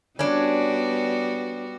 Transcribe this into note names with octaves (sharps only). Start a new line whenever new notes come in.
G3 B3 C#4 D4 F#4